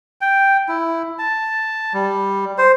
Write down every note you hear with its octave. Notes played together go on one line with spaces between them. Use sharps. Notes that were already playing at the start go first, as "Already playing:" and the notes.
G5
E4
A5
G3
C5